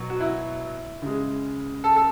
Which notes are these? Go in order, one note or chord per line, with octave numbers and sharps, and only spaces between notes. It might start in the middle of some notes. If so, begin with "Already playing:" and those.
Already playing: B2 F#3
F#4
E4
C#3 G#3
A4
A4